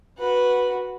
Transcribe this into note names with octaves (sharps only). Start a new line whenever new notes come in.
F#4 B4